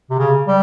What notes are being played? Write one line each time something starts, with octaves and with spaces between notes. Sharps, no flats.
C3
C#3
G3